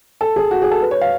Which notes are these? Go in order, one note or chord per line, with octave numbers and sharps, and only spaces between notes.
A4
G#4
F#4
G#4
A4
B4
C#5
F5